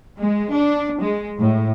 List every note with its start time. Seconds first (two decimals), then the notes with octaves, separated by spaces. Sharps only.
0.18 G#3
0.53 D4
1.02 G#3
1.39 A2